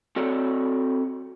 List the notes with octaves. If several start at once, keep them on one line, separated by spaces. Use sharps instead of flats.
C4 F#4 A4 C#5 D5